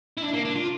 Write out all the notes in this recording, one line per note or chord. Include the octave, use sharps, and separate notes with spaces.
E4
D4
A#3
D4
F4